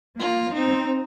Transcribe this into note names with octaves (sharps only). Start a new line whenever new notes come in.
A#3 F4
C4 D#4